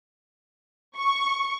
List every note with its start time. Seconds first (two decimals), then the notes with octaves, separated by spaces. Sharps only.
0.94 C#6